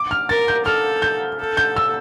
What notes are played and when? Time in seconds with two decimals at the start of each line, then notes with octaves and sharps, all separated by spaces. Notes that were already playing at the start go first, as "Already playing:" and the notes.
Already playing: D6
0.11 F6
0.29 A#4 A6
0.48 G6
0.65 A4 F6
1.02 G6
1.40 A4
1.57 G6
1.76 E6